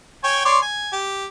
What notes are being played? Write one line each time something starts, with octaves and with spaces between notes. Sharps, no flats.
C#5 G5 G#5
C#5 D5 C6
G#5
G4